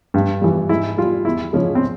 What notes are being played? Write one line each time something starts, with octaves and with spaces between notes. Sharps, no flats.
G2
E3 G3
G#2 E4
G3 F4
E2 E4
C#3 F3 G#3 C#4
C4